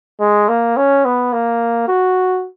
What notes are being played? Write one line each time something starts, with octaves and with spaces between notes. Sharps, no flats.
G#3
A#3
C#4
B3
A#3
F#4